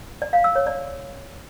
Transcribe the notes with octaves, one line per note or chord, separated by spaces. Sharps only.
D5
F5
E6
C#5
D5